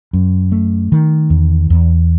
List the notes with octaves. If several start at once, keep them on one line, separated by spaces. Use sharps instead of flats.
F#2
A3
D#3
E2
E2